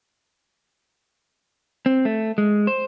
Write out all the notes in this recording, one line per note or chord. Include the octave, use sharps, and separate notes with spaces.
C4
A3
G#3
C5